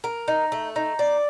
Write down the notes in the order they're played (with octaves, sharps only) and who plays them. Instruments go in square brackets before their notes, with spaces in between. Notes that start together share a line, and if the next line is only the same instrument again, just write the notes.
[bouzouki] A#4
D#4
A3
D#4
D5